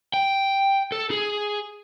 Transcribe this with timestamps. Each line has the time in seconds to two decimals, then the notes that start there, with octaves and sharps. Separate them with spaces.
0.14 G5
0.92 A4
1.11 G#4